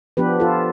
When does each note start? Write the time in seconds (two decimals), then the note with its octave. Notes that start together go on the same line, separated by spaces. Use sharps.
0.17 F3 B3 D4 G4 B4
0.40 F4 A4